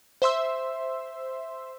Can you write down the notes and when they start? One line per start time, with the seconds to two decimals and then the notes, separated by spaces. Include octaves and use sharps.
0.22 C5 E5 C6 E6